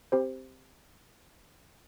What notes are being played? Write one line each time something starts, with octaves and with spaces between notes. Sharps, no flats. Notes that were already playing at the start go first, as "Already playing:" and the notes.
C4 G4 C5